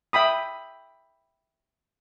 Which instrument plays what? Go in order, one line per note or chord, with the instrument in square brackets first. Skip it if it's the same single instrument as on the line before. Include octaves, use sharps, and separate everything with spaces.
[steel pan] E5 G5 B5 D#6